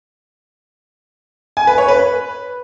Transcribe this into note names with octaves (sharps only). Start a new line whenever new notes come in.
G#5
B4
C#5
B4